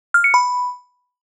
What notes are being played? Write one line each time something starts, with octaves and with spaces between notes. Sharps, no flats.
F6
C#7
B5